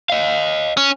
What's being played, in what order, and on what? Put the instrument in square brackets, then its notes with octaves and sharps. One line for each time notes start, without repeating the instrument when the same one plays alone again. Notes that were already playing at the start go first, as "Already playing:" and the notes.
[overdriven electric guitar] D#5 F5
[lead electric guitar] C#4